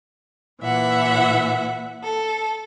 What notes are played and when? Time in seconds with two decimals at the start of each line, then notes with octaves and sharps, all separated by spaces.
0.61 A#2 E3 E5 F#5
2.02 A4